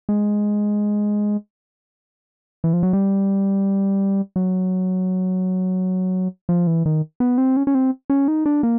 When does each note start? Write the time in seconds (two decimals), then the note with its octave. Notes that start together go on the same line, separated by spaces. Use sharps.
0.09 G#3
2.64 E3
2.73 F3
2.83 F#3
2.93 G3
4.36 F#3
6.49 F3
6.67 E3
6.86 D#3
7.20 B3
7.38 C4
7.57 C#4
7.67 C#4
7.75 C4
8.10 C#4
8.28 D#4
8.46 D4
8.63 A#3